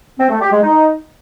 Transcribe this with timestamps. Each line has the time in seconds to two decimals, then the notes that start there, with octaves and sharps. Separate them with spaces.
0.19 C4
0.30 A3
0.41 G4
0.52 G#3
0.63 D#4